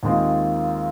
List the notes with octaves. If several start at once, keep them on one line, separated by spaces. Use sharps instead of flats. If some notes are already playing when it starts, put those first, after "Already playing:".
D#2 D#3 G#3 C4 F4